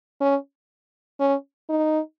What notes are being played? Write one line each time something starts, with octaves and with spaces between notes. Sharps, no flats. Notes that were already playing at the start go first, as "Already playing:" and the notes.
C#4
C#4
D#4